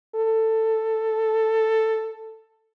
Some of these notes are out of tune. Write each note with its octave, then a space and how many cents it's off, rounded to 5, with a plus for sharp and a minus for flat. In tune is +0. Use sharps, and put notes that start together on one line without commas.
A4 +10